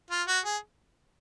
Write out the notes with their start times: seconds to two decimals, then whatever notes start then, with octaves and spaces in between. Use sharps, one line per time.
0.10 F4
0.28 F#4
0.45 G#4